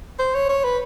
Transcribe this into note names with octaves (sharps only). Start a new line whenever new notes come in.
C5
C#5
C#5
B4